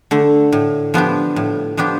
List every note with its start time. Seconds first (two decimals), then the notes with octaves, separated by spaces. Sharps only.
0.11 D3 A3
0.52 A2
0.94 F3 B3 D4 G4
1.36 A2
1.77 F3 B3 D4 G4